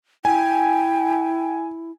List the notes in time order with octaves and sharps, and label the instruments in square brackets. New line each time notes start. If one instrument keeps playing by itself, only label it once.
[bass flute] E4 [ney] G5 [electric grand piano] G#5